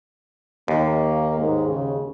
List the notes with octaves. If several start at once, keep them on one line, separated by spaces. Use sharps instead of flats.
D#2 A#3
G#2
C#3